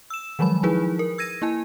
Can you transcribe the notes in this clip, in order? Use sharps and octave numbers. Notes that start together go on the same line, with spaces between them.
E6 E7
D#3 F3 F#3 G#3 B5
F3 D#4 E4 G#4 B4
A#4
E6 G#6 A#6 D#7
A#3 E4 G#5